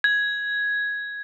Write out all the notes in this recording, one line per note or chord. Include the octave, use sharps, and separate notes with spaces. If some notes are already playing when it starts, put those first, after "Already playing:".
G#6